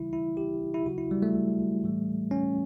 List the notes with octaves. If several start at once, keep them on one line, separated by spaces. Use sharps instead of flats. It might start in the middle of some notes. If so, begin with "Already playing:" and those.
Already playing: C#3 E3 G3 E4
E4
G4
E4
C#3 F#3 F#4
E4
G3
A3
A2 E3 G3
C#4